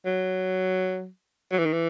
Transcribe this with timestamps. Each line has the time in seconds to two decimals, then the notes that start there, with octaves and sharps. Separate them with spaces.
0.06 F#3
1.51 F#3
1.59 E3
1.66 D#3
1.73 E3